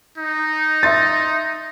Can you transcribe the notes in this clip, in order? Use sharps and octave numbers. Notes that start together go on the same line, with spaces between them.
D#4
E5 C6 A6